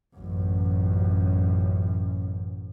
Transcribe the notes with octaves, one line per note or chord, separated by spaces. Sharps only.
A1 F#2